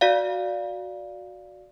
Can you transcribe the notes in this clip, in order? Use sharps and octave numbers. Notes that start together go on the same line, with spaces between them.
F#4 D5 F5